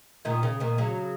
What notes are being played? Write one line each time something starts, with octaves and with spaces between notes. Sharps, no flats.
A#2 D#3
C#3
A#2 D#3
C#3 F#3